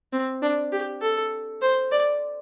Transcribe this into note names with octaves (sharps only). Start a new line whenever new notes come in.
C4
D4
G4
A4
C5
D5